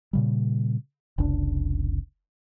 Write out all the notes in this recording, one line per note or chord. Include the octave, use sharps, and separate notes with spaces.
A#2 C#3 G3
F1 C2 C#3 D4